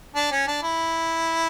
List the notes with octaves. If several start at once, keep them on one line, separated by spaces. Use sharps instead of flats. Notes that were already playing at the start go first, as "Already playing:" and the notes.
D4
C#4
D4
E4